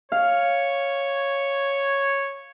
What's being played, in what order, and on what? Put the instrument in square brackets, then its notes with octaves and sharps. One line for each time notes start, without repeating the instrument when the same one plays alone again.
[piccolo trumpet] C#5 [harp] F5